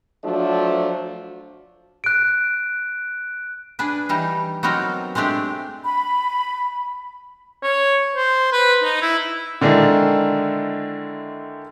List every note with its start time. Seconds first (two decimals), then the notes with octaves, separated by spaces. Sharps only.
0.23 F3 F#3 A3 D4
2.04 F#6 D7
3.79 D4 G#4 B4
4.09 E3 G3 D#4
4.63 F#3 B3 C4 D#4 F#4 A#4
5.15 G#3 A3 C4 D4 G4
5.84 B5
7.63 C#5
8.16 C5
8.52 B4
8.83 D#4
9.02 E4
9.61 D3 D#3 G#3 D4 E4